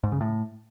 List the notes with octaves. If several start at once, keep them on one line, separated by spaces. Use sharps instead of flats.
G#2
C#3
A2